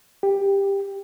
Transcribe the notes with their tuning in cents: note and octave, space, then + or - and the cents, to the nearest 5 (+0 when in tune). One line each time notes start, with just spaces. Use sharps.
G4 +15